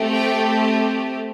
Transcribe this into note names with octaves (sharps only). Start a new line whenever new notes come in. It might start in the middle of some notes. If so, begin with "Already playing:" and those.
Already playing: A3 C4 G4
G5